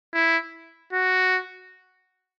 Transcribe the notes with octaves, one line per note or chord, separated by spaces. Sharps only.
E4
F#4